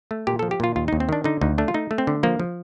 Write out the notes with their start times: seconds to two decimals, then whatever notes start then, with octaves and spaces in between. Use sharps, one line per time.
0.11 A3
0.27 A#2 G4
0.39 F3 A4
0.51 G4
0.60 A#2 F4
0.76 D#2 F4
0.88 D#4
0.93 D#2
1.00 C4
1.09 D#3 D4
1.24 D3 D#4
1.41 D2 D#4
1.58 A3 D4
1.68 F4
1.74 A3 D#4
1.91 A3
1.98 C4
2.07 D3
2.23 F3 A#3
2.40 F3